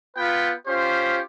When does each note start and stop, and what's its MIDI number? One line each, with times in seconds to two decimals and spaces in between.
0.17 0.53 59
0.17 0.53 65
0.17 0.53 71
0.17 0.53 79
0.67 1.20 61
0.67 1.20 65
0.67 1.20 67
0.67 1.20 72